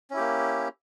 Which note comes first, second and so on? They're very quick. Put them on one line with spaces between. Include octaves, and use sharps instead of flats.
C#4 E4 G4 A#3